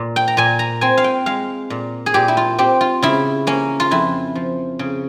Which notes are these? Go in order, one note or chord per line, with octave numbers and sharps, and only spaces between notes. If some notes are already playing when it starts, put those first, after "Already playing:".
Already playing: A#2
G5
A#5
A#2 G#5
A#5
C4 G#5
F5
G5
G#3 F5
A#2
G#4
A#2 G4
E4
F4
C4 G4
F4
C#3 E4
A#3 C#4
F4
F2 E4
F3
C#3